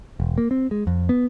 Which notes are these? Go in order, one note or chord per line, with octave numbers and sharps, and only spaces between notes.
E1
A#3
C4
G#3
F2
B3